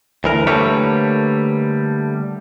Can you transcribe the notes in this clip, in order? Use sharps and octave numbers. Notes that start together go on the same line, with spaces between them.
D2 E3 A#4
D3 G3 A3 A#3 B4 C#5